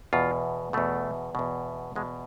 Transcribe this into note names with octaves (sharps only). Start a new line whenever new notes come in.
E2 B2 F4
E2 B2 A3
E2 B2
E2 B2 G#3